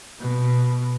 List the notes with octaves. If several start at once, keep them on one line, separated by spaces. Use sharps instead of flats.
B2